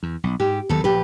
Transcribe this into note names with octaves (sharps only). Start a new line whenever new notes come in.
E2
B1
G#2 G4
D#2 D#3 F#3 B3 A4
A#1 A#2 G4 B4